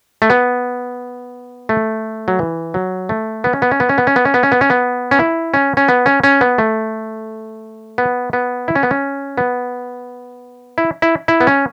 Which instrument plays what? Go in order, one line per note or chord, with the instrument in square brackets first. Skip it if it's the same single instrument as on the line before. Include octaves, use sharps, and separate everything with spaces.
[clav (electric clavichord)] A3
B3
A3
F#3
E3
F#3
A3
B3
C#4
B3
C#4
B3
C#4
B3
C#4
B3
C#4
B3
C#4
B3
C#4
B3
C#4
E4
C#4
C#4
B3
C#4
C#4
B3
A3
B3
B3
E4
C#4
B3
C#4
B3
E4
E4
E4
B3
C#4